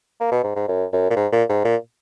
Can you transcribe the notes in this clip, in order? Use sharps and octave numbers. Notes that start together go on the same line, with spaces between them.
A#3
B2
G#2
G#2
F#2
F#2
A#2
G#2
A#2
G#2
A#2